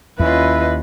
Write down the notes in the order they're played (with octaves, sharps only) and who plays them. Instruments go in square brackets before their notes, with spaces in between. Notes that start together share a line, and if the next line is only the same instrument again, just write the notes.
[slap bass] D#2 [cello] C#4 F4 [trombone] E4 [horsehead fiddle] B4 D#5